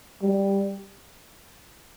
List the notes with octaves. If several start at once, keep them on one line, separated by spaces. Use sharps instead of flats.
G3